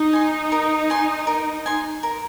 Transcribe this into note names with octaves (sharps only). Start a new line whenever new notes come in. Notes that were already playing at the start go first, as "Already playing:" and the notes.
Already playing: D#4
G#5 C6
A#4
G#5 C6
A#4
G#5 C6
A#4